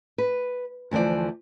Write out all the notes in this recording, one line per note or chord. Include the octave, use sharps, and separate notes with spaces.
B4
D2 E3 F3 C5 D5